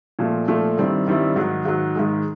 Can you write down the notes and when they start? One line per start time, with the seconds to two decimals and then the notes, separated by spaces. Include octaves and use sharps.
0.19 A#2 F3 A3
0.48 A#2 F3 A3
0.77 G2 D#3 G3 C4 E4
1.07 G2 D#3 G3 C4 E4
1.36 G#2 D#3 F#3
1.65 G#2 D#3 F#3
1.95 G#2 D#3 G#3